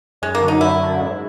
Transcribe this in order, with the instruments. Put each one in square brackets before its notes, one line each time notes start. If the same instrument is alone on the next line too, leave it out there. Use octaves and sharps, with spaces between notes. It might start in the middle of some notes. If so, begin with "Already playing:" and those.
[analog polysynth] F#2 [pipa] G#3
[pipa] A#3
[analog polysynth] D3 F#3
[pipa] D#4
[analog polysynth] F#2 [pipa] E4
[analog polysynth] D3 F#3
G#2